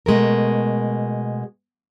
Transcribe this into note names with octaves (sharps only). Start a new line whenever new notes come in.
B2 G#3 A3 A#4